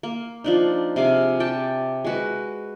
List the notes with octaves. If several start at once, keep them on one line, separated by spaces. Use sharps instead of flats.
A#3
F3 D4 D#4
C3 G#4 F5 D6
G4 G5 A5
G#3 F#4 B4